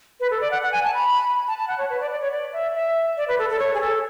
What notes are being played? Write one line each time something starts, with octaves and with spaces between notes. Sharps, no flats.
B4
A4
D5
F#5
F#5
G#5
A5
B5
A5
A5
F#5
C#5
B4
D5
D5
C#5
D5
E5
E5
D5
B4
A4
A4
C#5
G#4
A4